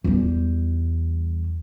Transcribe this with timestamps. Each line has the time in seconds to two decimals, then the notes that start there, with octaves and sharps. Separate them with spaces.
0.04 E2 G3